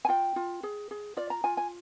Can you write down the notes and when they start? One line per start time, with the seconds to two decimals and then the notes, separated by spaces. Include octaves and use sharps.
0.05 G#5
0.08 F4 G5
0.36 F4
0.63 G#4
0.91 G#4
1.17 F4 D5
1.30 A#5
1.44 F4 G#5
1.57 G#5